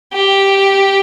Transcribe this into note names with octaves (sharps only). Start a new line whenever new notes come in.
G4